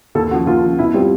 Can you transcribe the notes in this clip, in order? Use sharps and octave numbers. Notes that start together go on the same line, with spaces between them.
D#2 A4
C#3 F3 F#4
D#2 F4
C#3 F3
B2 E4
G3 C4 F4